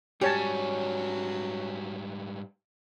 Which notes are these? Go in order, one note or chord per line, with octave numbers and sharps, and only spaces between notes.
G#2 F#3 G3 C#4 G4 C#5 A5